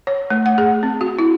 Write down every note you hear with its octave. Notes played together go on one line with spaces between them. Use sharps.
C#5
A3
F#5
G#4
C4
F#4
E4